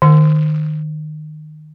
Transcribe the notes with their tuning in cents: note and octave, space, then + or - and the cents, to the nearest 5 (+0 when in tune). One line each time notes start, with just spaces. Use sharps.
D#3 -25